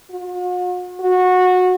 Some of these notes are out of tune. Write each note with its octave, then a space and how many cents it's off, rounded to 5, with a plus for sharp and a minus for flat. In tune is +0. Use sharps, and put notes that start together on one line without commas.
F#4 -45
F#4 -20